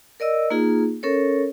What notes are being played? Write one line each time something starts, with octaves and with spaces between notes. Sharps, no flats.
A#4 D5 D#5 E6
A#3 D#4 F4 G#4
C#4 A4 A#4 C#5